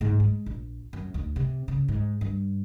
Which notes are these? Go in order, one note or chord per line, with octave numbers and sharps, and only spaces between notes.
G#2
G#3
A#1
F#2
D2
C3
C#3
G#2
G2